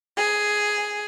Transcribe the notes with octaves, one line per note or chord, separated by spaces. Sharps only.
G#4